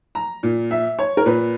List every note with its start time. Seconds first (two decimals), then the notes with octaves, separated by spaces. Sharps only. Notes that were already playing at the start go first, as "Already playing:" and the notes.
0.15 A#5
0.43 A#2
0.71 E5
0.99 C#5
1.17 A#4
1.26 A#2 B4